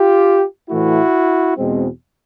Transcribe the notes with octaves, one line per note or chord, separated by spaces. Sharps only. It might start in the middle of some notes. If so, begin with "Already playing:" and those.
Already playing: F4 G4
A2 E3 A3 E4 F#4
E2 B2 G#3 C4